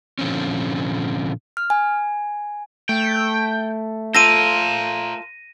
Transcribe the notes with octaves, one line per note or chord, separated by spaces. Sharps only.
A#2 D3 F3 C4 C#4
F6
G#5
A3 G5
F4 A4 A#4 C5 A#6 D#7